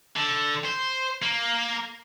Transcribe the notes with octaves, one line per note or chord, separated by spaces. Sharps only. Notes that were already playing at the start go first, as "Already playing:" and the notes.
D3
C5
A#3